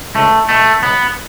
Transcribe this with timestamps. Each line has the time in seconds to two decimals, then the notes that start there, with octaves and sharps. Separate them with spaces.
0.15 C#2 A3
0.49 B2 A3
0.82 C#2 B3